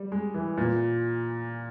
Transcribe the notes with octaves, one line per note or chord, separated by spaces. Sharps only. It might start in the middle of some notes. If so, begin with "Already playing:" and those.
Already playing: G3
G#3
E3
A#2